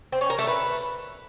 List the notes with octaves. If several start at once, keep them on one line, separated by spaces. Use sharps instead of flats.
C4
C#4
A#4
A3
B4